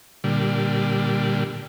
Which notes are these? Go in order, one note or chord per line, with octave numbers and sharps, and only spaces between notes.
A#2 D3 G3